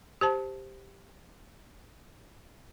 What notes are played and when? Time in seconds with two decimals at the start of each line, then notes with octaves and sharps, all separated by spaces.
0.21 G4 C5 A5